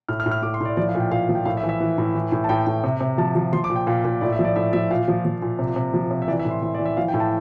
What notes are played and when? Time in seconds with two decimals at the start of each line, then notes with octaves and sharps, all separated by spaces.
0.09 A2 F6
0.20 F6
0.26 A2
0.31 F6
0.42 A2 D6
0.54 C6
0.61 A2 D5
0.77 F3 D5
0.89 F5
0.95 A#2
1.00 G5
1.12 A#2 F5
1.29 F3
1.35 G5
1.45 A2 F5
1.57 E5
1.64 E3
1.69 E5
1.81 E3
1.98 A2
2.15 E3
2.32 A2
2.44 A5
2.49 A2 G5
2.67 A2
2.84 C3
3.01 C3
3.18 F3 A5
3.35 F3
3.53 F3 C6
3.64 D6
3.70 A#2
3.76 G5
3.87 A#2 F5
4.04 A#2
4.21 A2 D5
4.32 E5
4.39 F3
4.44 D5
4.56 A2 E5
4.73 F3 E5
4.90 A#2 F5
5.08 F3
5.25 F3
5.42 A#2
5.59 C3
5.76 C3
5.94 F3
6.11 C3
6.22 E5
6.28 E3 D5
6.39 E5
6.45 A2
6.51 C6
6.63 E3 C6
6.75 D5
6.79 E3
6.85 E5
6.97 F3 F5
7.08 G5
7.14 A2
7.20 A5